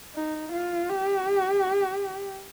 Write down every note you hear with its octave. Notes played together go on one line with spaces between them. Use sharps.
D#4
F4
G4